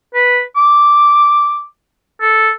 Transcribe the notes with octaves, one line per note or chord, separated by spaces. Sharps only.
B4
D6
A4